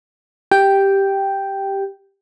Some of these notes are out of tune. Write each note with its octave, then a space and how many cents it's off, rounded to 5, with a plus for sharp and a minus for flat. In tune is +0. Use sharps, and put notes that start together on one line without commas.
G4 +0 G5 +0